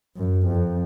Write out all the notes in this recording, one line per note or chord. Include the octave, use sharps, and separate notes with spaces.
F#2
F2